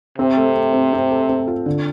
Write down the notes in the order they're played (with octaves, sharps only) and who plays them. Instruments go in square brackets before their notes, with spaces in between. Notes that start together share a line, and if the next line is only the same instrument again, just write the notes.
[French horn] C3 [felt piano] C4
[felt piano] A3
A3
C4
C4
A4
C4
F4
D3